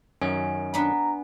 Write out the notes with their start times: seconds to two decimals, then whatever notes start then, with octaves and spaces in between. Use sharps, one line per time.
0.22 F#2 D#3 C#4 G#5
0.74 B3 D4 B4 A#5